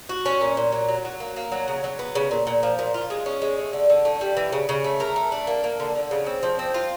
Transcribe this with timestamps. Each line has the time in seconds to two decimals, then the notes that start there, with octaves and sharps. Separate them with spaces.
0.09 F#4
0.26 C#4
0.41 A#2
0.57 A#2
0.72 F#3
0.89 F#3
1.05 F#3
1.20 A#3
1.36 A#3
1.52 F#3
1.68 C#3
1.84 F#3
1.99 B3
2.15 C#3
2.31 A#2
2.47 A#2
2.63 F3
2.79 A#2
2.94 F4
3.10 G#3
3.26 C#4
3.42 G#3
3.58 A3
3.73 D3
3.90 D3
4.05 A3
4.21 G3
4.37 E3
4.52 C#3
4.69 C#3
4.84 A3
5.00 A#4
5.16 A3
5.32 D4
5.47 A#3
5.64 A#3
5.80 D3
5.95 D3
6.11 C#3
6.26 C4
6.43 F3
6.59 C4
6.74 F4